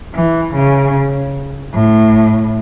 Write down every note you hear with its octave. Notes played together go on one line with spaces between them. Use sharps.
E3
C#3
A2